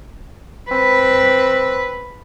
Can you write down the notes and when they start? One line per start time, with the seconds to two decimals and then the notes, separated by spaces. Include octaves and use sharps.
0.71 C4 B4